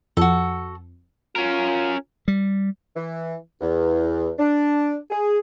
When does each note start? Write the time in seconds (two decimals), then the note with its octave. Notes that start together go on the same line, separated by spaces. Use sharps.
0.17 F2 F#4 A4
1.36 C#4 F4 A#4
2.28 G3
2.96 E3
3.61 E2
4.39 D4
5.10 G#4